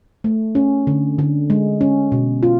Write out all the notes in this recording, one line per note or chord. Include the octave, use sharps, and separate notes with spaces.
A3
C#4
D3
D3
G#3
C#4
B2
F4